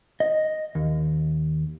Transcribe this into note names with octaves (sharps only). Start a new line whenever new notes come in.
D#5
D#2